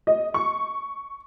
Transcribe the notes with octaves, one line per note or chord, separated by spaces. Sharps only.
D#5
C#6